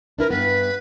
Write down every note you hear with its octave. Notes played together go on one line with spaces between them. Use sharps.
D4 E4 A#4 B4
G2 B3 B4